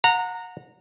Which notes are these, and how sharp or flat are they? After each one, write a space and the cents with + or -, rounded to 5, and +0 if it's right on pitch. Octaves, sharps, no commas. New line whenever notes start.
F#5 -25 A#5 -15